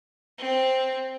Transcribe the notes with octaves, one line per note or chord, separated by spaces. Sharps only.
C4